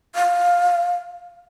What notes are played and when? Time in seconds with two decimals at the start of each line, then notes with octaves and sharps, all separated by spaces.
0.15 F5